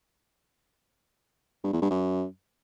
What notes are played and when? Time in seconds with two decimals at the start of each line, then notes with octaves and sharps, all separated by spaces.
1.64 G2
1.73 E2
1.82 G2
1.90 F#2